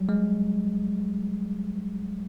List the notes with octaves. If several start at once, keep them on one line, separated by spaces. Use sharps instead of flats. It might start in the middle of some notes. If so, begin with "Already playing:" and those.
Already playing: F#3 G3
G#3